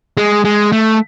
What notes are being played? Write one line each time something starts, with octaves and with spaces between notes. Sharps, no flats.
G#3
G#3
A3